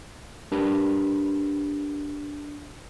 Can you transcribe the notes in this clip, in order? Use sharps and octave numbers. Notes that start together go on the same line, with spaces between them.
D4 G4 A#4 B4